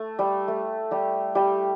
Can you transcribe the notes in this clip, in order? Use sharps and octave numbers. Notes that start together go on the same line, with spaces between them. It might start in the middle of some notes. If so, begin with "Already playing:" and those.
Already playing: A3
G3
A3
G3 G4
G3 G4